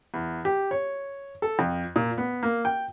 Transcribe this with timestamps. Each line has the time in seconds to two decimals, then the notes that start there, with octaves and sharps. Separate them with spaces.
0.14 E2
0.45 G4
0.71 C#5
1.42 A4
1.59 F2
1.96 A#2
2.18 B3
2.43 A#3
2.65 G5